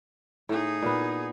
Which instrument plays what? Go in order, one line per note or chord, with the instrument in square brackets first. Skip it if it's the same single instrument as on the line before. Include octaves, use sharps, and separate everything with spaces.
[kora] A2 [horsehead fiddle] D#4 G#4
[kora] A#2 B3